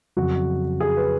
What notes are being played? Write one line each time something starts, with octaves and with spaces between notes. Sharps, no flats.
F2 C#3 F#3 F#4
G#4
B4